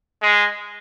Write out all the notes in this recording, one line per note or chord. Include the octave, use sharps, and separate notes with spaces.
G#3